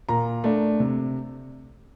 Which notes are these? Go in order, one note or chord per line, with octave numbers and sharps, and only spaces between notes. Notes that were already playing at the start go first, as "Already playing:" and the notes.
A#2 A#5
A3 D4
C3